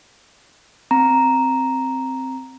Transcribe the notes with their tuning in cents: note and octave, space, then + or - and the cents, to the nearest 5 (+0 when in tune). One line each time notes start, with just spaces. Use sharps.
C4 +0 A#5 +0